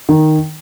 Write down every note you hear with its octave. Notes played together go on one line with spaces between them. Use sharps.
D#3